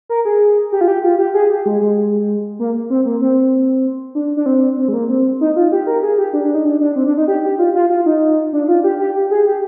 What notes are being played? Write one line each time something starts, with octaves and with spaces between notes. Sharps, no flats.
A#4
G#4
G4
F4
G4
F4
G4
G#4
G4
G#3
G#3
A#3
C4
A#3
C4
D4
D4
C4
C4
G#3
A#3
C4
D#4
F4
G4
A#4
G#4
G4
D4
D4
D#4
D4
D4
C4
D4
D#4
G4
G4
F4
F4
F4
D#4
D4
F4
G4
G4
G4
G#4
G4